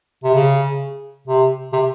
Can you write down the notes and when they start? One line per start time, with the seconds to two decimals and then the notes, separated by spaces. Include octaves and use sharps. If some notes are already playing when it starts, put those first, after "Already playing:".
0.24 C3
0.35 C#3
1.27 C3
1.73 C3